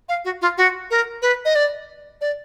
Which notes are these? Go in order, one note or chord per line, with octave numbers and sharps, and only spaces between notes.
F5
F#4
F4
F#4
A#4
B4
D#5
D5
D5